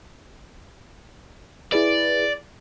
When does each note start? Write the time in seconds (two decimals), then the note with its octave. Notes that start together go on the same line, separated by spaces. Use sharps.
1.72 E4 G#4 B4 D5